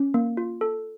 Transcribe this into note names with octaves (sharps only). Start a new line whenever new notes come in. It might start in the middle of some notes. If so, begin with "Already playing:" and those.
Already playing: C#4
A#3
F4
A4